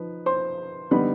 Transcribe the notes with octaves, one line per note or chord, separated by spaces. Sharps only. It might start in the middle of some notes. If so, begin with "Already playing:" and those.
Already playing: F3 D#4 B4
C5 C6
D3 G3 B3 D#4 B4 B5